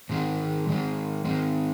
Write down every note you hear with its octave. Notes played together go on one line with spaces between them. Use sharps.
G#2 D#3 G#3
G#2 D#3 G#3
G#2 D#3 G#3